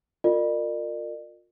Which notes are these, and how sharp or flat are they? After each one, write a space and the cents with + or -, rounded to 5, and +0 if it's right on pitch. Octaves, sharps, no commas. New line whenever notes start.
F4 +25 A#4 -25 D5 +45